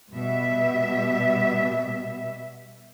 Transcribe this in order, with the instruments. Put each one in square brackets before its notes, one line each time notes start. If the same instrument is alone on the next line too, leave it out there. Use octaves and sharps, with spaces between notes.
[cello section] B2 G3 E5